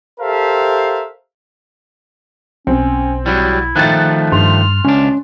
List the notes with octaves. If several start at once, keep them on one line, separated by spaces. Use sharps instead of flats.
G4 A4 A#4 C5 E5 F5
B1 C4 C#4
F#3 G3 E4
D#3 F3 A3 F#6 A6
G2 C6 F6
C#2 C#4 D4